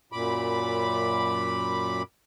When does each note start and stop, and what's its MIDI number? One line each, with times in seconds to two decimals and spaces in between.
0.12 2.03 42
0.12 2.03 46
0.12 2.03 83
0.12 2.03 86